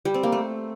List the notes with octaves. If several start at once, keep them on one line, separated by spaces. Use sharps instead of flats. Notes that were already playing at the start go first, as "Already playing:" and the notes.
G3
C4
A#3
A3